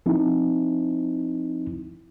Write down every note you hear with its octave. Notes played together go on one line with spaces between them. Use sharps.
F3 C4 D#4 E4